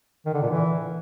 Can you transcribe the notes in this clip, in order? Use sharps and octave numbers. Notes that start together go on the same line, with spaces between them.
D#3
D3
A#2
E3